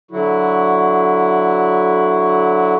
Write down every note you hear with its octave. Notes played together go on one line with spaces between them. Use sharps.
D3 F#3 E4 F#4